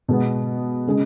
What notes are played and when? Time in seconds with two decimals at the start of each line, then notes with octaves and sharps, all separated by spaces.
0.08 B2 G#3 B3
0.87 C#3 G#3